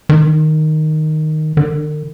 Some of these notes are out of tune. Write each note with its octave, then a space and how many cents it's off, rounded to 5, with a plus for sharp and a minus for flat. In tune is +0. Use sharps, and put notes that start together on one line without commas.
D#3 -5
D#3 -45